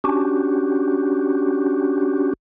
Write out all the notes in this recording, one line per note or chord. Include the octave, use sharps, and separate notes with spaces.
C#4 D4 F#4 G4